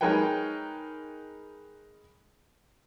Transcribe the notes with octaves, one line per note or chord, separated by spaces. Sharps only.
G#3 D#4 A#4 B4 C#5 G5